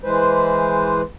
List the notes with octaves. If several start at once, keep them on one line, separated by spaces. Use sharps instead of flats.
E3 G#3 B4 C5